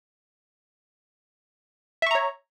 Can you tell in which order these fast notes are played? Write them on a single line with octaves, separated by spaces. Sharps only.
E5 C#6 A#5 C#5